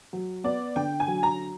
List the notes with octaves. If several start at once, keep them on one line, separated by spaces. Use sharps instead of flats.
F#3
B3 D5
D3 G5
G#5
F#3
A#5